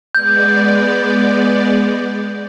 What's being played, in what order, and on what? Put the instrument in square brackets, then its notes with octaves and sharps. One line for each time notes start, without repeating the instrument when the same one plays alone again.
[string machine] G#3 B3 D5 [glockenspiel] G6